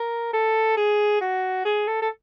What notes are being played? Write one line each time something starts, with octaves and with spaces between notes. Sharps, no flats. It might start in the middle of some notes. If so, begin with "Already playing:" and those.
Already playing: A#4
A4
G#4
F#4
G#4
A4
A4